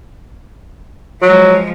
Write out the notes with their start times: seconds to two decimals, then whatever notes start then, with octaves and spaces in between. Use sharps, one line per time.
1.22 F3 F#3 G#3